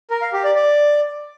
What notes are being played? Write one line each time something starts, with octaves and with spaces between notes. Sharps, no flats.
A#4
F5
G4
D5
D5